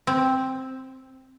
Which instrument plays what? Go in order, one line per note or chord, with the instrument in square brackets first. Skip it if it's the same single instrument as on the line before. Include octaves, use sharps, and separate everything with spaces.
[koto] C4